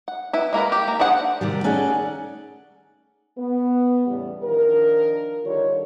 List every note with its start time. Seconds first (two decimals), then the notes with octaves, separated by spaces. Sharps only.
0.08 F#5
0.33 E4 B4
0.53 G#3 A#3 A#4 B4
0.72 G4
0.88 A#3
0.99 D4 G#4 C5 F#5
1.41 C3 D#3 G3
1.64 A3 C#4 D#4 G#4 D5 F#5
3.38 B3
4.06 E2 A2 C#3 G3
4.44 D#3 F3 D4 A#4
5.45 D3 D#3 G3 F4 A4 C#5